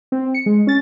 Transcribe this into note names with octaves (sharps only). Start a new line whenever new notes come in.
C4
C#7
G#3
C#4 A6